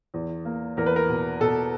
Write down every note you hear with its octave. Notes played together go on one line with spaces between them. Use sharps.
E2
A#3
E2 A#4
B4
A#4
B2
B2 A4